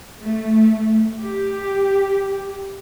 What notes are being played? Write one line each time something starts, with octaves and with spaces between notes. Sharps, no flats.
A3
G4